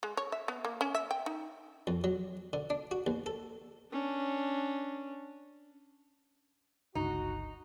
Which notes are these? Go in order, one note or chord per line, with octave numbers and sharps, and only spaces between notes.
G#3
C#5
E5
B3
A#3
C#4
E5
G5
D#4
F2
F#3
D3
D4
F#4
D#2
A4
C#4 D4
G1 C#2 D#4 F#4